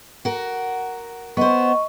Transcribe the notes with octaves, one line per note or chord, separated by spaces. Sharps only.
F#4 A#4
B3 C5 D#5 C#6